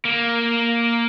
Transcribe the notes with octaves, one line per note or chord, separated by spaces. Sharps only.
A#3